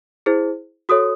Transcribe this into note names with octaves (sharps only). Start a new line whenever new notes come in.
E4 G#4 C5
F#4 A4 C#5 D#6